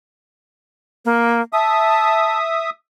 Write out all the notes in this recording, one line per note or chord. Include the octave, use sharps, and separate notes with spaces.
A#3
E5 A5 D#6